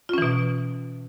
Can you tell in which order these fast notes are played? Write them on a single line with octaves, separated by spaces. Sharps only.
F4 C#4 E3 B2